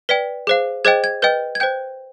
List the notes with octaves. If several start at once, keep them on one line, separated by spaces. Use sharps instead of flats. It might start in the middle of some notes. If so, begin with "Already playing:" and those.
B4 D5 G5 B6
G#4 C5 F5
G#4 C5 D#5 G5 G#6
G#6
B4 D#5 G5 G6
G#6
C5 G5 G6